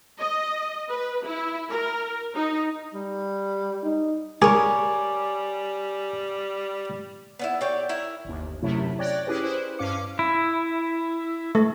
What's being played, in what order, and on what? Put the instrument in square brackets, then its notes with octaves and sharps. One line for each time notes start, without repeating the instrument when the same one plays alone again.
[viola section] D#5
B4
E4
A#4
D#4
[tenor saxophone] G3
[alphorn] D#4
[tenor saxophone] G3 [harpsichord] G#4 [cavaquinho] A#4 C#5 [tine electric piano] G#5 D6
[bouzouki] B3 C#4 E4
G4 C#5 D5
E4 A#4
[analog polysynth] G1 D#2
F#2 C3 F#3 A3 E4
C#5 D5 G5 F#6 A#6
C#4 E4 G4 G#4 B4
E4 B4 C5
G2 C#4 F5 D6 C#7
[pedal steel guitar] E4
[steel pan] A3